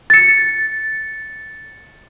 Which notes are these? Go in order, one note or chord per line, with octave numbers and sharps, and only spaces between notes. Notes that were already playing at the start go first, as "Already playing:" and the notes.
A6 C#7